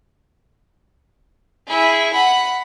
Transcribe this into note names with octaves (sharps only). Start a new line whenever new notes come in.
E4 G#4
F#5 B5